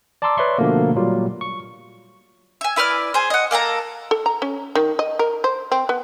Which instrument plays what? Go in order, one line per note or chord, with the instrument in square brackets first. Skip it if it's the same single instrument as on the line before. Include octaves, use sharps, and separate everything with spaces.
[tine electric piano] D5 A5 A#5 C6 D6 E6
B4 C#5 D5 E5 C6 C#6
B2 D3 F3 A3 A#3
A#2 F#3 G3 F4
C#6
[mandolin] E5 G#5
E4 B4 D5 F6
G#4 C5
D#5 F#5
A#3 A4 A5 A#5
[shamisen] A4
A#5
C#4
D#3
D#5
A#4
C5
C4
B3